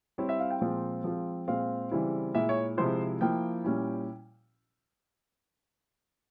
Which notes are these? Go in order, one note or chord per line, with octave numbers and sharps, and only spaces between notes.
G3 C4 E4 C#5
E5
F5
G5
A#2 F3 G#3 C4 F4
F3 G#3 C4 F4
A#2 G#3 C4 F5
C#3 E3 G3 C4 E4
A#2 G#3 E4 E5
C#5
C3 F3 G#3 E4 C5
F3 A#3 E4 G5
A#2 G3 C#4 E4